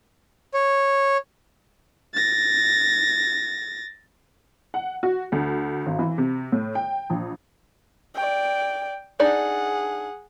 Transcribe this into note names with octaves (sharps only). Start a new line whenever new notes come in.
C#5
A6 A#6
F#5
F#4
D2
G#1
E3
C3
A2
G5
A#1
D5 G5
D4 D#4 G#4 D5 F#5